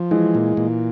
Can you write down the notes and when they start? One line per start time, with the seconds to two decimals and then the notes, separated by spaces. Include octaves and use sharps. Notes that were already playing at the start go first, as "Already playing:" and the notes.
Already playing: F3
0.11 E3 G#3
0.35 A#2
0.57 A#2